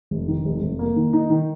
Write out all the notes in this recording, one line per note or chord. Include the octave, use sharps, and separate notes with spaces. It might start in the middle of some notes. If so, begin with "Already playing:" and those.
F1
D#3
F1
F1
A#3
D#3
D#4
D#3